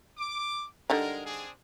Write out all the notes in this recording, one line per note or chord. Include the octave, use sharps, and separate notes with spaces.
D6
D3 G3 G#3 D#4 A#4
C4 D4 G#4